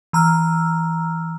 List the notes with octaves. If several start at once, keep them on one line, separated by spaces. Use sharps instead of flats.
E3 A#5 E6 F6